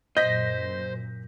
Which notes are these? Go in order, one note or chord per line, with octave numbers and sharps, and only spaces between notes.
F#2 A#2 C5 D#5 G6 A#6 B6